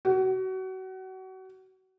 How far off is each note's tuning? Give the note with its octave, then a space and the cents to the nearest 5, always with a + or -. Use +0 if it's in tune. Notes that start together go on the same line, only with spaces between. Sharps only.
F#4 +30